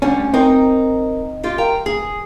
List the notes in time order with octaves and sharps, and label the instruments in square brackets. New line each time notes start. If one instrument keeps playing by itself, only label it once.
[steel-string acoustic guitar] D3 G3 A3 [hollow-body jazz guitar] C#4
[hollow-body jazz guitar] C4 D#4 [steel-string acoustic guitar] A#4
[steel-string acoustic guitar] F4 G4 F5
A#4 G5 A#5
G#4